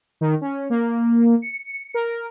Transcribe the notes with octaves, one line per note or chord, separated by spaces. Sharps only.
D#3
C#4
A#3
C#7
A#4